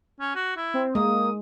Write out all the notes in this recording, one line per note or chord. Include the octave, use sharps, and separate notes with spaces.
C#4
F#4
E4
C4
G#3 A#3 D#6